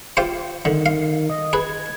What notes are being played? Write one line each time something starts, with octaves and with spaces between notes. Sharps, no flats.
F4 G4 C5
D3 D#3
F5
D#5
G#4 B4 G#6